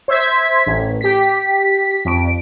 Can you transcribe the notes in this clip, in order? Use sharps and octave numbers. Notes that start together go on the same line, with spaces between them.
C5 E5 G#6 B6
A1
G4 B6
F2 D7